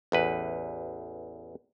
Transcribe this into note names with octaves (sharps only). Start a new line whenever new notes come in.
A1 E2 B4